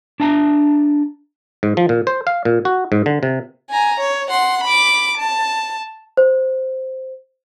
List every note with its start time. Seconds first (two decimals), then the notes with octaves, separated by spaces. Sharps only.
0.20 D4 E5 A5 A#5
1.63 G#2
1.77 F3
1.89 A#2
2.07 C5
2.27 F5
2.45 A#2
2.65 F#4
2.92 G#2
3.06 D3
3.23 C3
3.70 G#5 A#5
4.00 C#5
4.30 F#5 C6
4.63 B5 D6
5.17 A5
6.17 C5